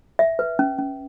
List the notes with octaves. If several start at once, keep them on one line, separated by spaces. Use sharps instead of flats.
E5
B4
C#4
C#4